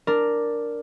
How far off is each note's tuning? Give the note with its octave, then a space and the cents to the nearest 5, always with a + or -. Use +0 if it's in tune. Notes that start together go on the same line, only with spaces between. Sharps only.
D4 +0 A#4 +0